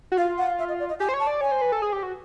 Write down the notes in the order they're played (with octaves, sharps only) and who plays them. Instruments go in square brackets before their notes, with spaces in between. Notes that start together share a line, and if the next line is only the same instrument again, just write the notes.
[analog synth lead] F#4
[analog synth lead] F4 [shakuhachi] F5
[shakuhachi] F#5
E5
D#5
D5
D#5
[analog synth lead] G4 [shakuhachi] G#5
[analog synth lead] C5
C#5
[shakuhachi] A5
[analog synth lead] D5
[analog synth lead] C#5 [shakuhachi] G#5
[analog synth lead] C5
B4
A4
G#4
G4
F#4